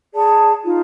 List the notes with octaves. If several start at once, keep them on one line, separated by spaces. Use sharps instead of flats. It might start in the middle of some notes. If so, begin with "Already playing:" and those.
G#4 D5 A5
D#4 F4